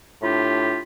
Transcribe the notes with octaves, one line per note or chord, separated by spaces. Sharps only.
A2 D4 F4 G4 B5